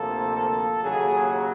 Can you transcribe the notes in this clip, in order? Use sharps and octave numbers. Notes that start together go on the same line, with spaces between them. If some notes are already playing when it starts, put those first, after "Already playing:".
Already playing: D2 C3 F3 A#3 A4
A4
D#2 C#3 F#3 G#4